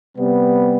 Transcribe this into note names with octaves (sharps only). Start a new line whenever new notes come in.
C3 G3 B3